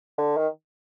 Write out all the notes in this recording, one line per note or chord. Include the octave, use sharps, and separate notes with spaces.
D3
D#3